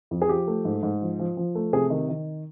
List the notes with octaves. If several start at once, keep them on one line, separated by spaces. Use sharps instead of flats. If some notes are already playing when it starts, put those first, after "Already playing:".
F2
G#4
F3 G4
A3
G#2
G#2
F3
F3
F3
A3
C3 G#4
D#3
D#3